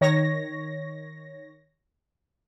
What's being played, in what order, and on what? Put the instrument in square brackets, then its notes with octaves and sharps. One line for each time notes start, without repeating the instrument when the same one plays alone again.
[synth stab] D#3 C#5 A#6